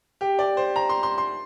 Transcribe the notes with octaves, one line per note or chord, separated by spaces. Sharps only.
G4
D5
C5
A#5
C6
C6
C6